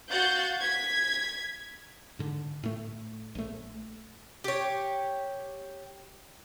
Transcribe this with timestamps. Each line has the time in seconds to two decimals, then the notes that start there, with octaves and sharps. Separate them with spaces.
0.11 F#4 F5 F#5 G6 A6
0.62 G#6 B6
2.19 G#2 D3
2.63 A2 A3
3.35 A#1 A3
4.44 G4 C#5